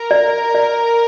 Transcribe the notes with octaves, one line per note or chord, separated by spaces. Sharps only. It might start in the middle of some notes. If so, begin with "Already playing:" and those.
Already playing: A#4
D5
D5